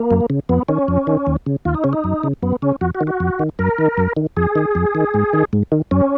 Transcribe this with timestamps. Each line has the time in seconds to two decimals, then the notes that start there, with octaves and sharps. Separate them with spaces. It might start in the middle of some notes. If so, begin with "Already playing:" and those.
Already playing: A#3
0.11 F#2
0.30 C#3
0.49 F2 B3
0.68 D#3 C#4
0.88 F2
1.07 D#3
1.27 D#2
1.46 C#3
1.65 D#2 F4
1.74 D#4
1.84 C#3 C#4
1.93 D#4
2.04 F#2
2.23 C#3
2.43 F#2 B3
2.62 C#3 C#4
2.81 F2 F#4
2.95 F#4
3.01 D#3
3.07 F#4
3.20 F2
3.39 D#3
3.59 F#2 A#4
3.78 D#3
3.98 F#2
4.17 D#3
4.37 F2 G#4
4.55 D#3
4.75 F2
4.95 D#3
5.14 G#2
5.33 D#3
5.53 G#2
5.72 D#3
5.91 F#2 C#4